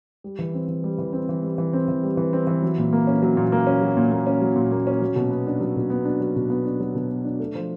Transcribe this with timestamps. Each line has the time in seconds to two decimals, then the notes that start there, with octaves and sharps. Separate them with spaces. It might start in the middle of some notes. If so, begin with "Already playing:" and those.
0.24 G3
0.39 E3
0.54 C4
0.68 E3
0.84 G3
0.98 E3
1.13 C4
1.29 E3
1.43 G3
1.58 E3
1.73 C4
1.88 E3
2.03 G3
2.17 E3
2.33 C4
2.47 E3
2.62 F#3
2.78 A#2
2.93 A#3
3.07 C#4
3.22 F#3
3.37 A#2
3.52 A#3
3.67 C#4
3.81 F#3
3.97 A#2
4.12 A#3
4.26 C#4
4.42 F#3
4.56 A#2
4.71 A#3
4.87 C#4
5.02 F#3
5.16 B2
5.30 B3
5.47 D4
5.61 F#3
5.76 B2
5.90 B3
6.05 D4
6.20 F#3
6.36 B2
6.50 B3
6.65 D4
6.80 F#3
6.95 B2
7.11 B3
7.24 D4
7.39 A3
7.55 F3